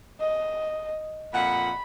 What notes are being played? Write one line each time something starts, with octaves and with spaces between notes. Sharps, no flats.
D#5
F2 A#2 F#5 B5